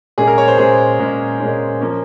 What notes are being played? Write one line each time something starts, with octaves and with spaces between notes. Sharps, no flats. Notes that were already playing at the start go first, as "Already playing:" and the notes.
A#2 G#3 C#4 G#4
A#4
C#5
C5
A#2 G#3 C#4 G#4
A#2 G#3 C#4
A#2 G#3 C#4
F3 A#3 C#4